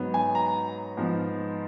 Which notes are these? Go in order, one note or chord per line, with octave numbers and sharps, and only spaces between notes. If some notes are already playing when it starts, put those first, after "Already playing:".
Already playing: G#2 F#3 B3
G#5
A#5
G#2 F3 B3